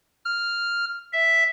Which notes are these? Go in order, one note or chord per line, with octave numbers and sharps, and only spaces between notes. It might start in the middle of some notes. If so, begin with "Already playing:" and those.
F6
E5